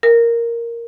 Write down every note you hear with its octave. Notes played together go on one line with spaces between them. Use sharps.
A#4